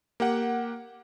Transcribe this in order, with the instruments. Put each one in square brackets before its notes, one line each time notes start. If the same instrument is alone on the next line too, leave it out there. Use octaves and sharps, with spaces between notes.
[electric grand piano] A#3 G4 F#5